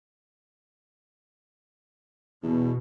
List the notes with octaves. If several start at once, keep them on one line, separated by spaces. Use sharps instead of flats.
E2 B2